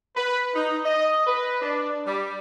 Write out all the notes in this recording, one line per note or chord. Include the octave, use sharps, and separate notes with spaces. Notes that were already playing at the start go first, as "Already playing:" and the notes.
B4
D#4
D#5
B4
D4
G3